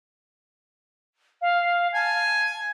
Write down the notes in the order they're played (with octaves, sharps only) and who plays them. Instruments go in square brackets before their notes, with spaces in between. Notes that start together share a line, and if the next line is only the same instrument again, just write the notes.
[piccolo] F5
[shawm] G#5 [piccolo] A5